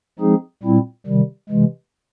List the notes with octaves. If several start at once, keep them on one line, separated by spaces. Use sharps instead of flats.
F3 G#3 C4 D#4 G#4
A#2 G3 C4 E4
C3 D#3 G3
C3 E3 G#3